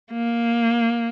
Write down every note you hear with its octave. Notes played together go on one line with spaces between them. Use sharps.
A#3